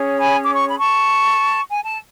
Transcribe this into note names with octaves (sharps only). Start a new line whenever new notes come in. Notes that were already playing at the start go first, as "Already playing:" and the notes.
Already playing: C#4 G#4 C#5
G#5 B5
D6
C#6
B5
A5 C#6
G#5
A5